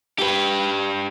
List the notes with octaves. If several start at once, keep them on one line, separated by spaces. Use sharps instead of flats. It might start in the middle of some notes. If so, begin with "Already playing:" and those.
G4 B4